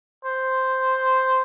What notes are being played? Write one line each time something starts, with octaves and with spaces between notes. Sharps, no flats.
C5